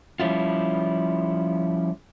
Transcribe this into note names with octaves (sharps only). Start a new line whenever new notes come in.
F3 G3 C#4 E4 F4